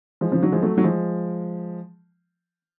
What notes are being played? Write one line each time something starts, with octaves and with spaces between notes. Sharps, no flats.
F3 G#3
C#3 F3
D3 F#3
F3 G#3
F#3 A3
F#3
F3 G#3